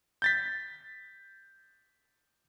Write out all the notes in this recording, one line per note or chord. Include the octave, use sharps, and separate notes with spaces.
G6 A6 B6